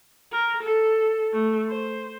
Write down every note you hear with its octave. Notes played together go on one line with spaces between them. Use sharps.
A#4
A4
A3
C5